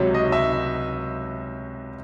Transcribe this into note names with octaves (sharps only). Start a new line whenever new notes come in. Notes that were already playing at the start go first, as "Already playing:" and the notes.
Already playing: C#2 C3 F#3 C#5
D#5
E5